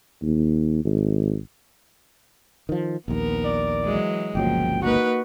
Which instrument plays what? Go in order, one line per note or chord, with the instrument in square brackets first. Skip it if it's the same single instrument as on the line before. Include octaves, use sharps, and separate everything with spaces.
[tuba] D#2
G#1
[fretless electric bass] D#3 F3
[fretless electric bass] A#1 D#2 [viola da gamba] B3 A#4
[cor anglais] D5
[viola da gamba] E3 F#3 G#3
[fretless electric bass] G1 C#2 F#3 [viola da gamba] A#2 F3 [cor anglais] G5
[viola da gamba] A#3 D#4 B4 [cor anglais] F#4